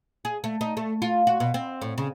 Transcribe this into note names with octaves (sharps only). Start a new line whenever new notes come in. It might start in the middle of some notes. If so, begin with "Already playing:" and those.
G#4
A3
D#4
A3
F4
F#4
B2
C4
A2
C#3